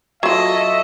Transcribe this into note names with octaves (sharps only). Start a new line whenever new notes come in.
F#3 F4 A4 D#5 E5 C#6